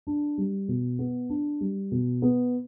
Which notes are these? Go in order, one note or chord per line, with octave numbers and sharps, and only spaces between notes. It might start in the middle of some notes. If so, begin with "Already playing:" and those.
D4
G3
B2
B3
D4
G3
B2
B3